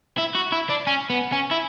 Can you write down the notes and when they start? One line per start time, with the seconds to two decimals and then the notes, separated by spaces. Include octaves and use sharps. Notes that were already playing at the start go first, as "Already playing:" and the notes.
0.18 E4
0.35 F#4
0.52 E4
0.69 D4
0.87 C#4
1.10 B3
1.32 C#4
1.51 E4